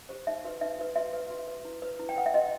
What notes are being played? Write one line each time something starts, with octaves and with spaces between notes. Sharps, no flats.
G4 C5
D#4 E5
F#4 B4
D#4 E5
F#4 B4
F#4 E5
B4
F#4
B4
E4
B4
E4
G5
B4 F#5
E5
F#4 D#5